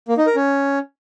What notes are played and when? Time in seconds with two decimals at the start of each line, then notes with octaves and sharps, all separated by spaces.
0.08 A#3
0.17 D#4
0.26 A#4
0.36 C#4